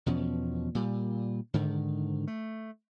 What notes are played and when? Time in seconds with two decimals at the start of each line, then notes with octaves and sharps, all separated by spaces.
0.06 E2 B2 F3 C#4
0.75 A#2 G3
1.54 G#2 D3 D#3
2.27 A3